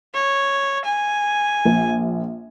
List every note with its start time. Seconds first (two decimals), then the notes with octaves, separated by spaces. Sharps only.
0.14 C#5
0.85 G#5
1.65 A#1